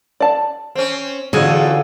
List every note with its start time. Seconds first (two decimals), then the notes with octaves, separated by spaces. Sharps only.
0.20 D5 A5
0.75 C4 C#4
1.33 E2 D3 C#4 F4 F#4 G#4